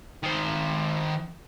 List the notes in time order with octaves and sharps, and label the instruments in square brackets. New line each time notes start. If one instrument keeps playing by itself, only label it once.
[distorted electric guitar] D#3 C5